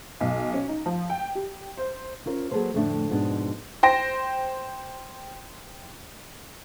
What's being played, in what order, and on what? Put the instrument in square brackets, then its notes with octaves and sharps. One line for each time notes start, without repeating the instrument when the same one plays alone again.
[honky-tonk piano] B1
C#4
D#4
F3
G5
G4
C5
[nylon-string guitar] C#4 F4 A#4 C5
F#3 A#3 G#4 A4 B4 C5
F2 A2 D3 A3 D4
F2 G#2 B2 G#3 B3 D4
[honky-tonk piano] C5 G5 A#6